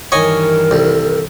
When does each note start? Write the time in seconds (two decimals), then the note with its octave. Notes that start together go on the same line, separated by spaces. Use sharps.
0.12 G2 D#3 E3 A#4 C#5 D#5 G#5
0.71 C2 A4